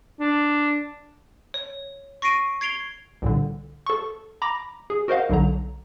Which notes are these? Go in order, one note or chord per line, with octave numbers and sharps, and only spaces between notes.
D4
C#5
C#6 A#6 C7 D7 D#7
G#6 C7 D7 F7 G7
C2 A#2 D3
A4 C#6
A#5 B5 D6 A#6
G#4
F#4 A#4 C5 D#5 F5 F#5
B1 D3 F#3 A#5